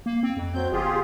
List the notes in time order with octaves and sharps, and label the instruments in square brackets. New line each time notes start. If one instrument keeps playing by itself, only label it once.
[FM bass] A#3
C4
F2
[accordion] F#3 C4 G6
[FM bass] G1 [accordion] F4 G4 G#4